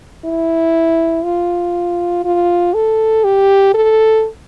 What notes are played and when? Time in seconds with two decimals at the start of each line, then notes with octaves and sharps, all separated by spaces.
0.25 E4
1.24 F4
2.24 F4
2.74 A4
3.24 G4
3.74 A4